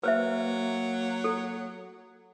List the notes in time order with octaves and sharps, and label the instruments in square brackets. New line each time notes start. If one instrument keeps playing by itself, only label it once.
[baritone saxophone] F#3 [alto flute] A#3 [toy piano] B4 C5 E5
[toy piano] A4